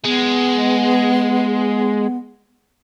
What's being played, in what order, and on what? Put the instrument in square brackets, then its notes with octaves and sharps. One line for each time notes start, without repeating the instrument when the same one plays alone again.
[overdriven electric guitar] G#3 [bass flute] B3